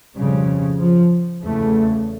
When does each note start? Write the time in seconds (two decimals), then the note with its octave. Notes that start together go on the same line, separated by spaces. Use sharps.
0.16 F2 C#3 G3
0.80 F3
1.43 E2 C#3 A3